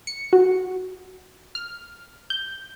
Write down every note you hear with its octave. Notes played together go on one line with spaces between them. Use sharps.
C#7
F#4
F6
G6